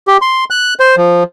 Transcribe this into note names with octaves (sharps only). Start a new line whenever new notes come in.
G4
C6
F#6
C5
F3